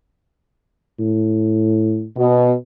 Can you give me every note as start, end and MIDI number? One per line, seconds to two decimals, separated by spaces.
1.00 2.06 45
2.17 2.53 47